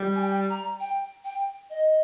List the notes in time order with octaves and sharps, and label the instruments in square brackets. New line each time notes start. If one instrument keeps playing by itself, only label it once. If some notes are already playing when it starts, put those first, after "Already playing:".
Already playing: [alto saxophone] G3
[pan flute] G#5
G5
A#5
G5
G5
D#5